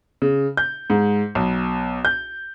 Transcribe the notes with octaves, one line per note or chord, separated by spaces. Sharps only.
C#3
G6
G#2
B1
G6